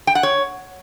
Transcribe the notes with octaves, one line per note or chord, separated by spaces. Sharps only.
G5
F#5
C#5